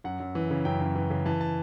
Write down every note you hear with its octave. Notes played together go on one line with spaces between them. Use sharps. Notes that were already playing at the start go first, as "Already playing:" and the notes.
F#2 F#5
F#2
E3
C#3
F#2 G5
F#2
E3
C#3
E3 A5
A5